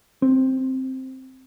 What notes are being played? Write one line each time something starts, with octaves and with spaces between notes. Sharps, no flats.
C4